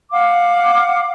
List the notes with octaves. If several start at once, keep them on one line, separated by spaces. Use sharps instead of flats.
F5 F#5 D6